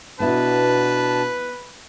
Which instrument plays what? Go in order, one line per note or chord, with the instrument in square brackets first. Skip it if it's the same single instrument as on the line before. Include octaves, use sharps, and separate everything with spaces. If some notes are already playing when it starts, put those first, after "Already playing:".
[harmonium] B2 D4 A5 [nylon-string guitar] B3 E4 [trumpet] B4